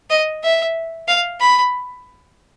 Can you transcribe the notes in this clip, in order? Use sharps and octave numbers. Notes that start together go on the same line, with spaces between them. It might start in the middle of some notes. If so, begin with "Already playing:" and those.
D#5
E5
F5
B5